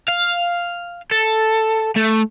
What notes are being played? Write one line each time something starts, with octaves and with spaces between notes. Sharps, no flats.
F5
A4
A3